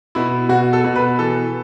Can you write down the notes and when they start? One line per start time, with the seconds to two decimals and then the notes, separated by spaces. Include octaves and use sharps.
0.15 B2 E4
0.49 B2 F#4
0.73 A4
0.84 B2
0.96 B4
1.19 E3 A4